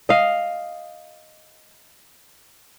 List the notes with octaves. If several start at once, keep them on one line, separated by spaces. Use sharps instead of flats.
D#5 F5